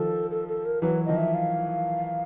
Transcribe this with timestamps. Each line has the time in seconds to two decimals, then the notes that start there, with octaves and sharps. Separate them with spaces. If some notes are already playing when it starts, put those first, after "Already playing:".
Already playing: D#3 F3 A4
0.31 A4
0.48 A4
0.65 A#4
0.82 E3 F#3 B4
1.05 D#3 F3 D#5
1.17 E5
1.34 F5